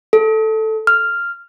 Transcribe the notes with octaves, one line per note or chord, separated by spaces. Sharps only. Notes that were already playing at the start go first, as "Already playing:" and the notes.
A4
F6